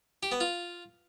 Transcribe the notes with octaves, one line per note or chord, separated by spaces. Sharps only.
G4
B3
F4